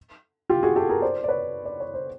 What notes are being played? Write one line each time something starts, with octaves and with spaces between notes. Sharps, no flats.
F4 G4
F#4 G#4
G4 A4
G#4 A#4
C5 D5
D5
B4 C#5
D5
C#5
C5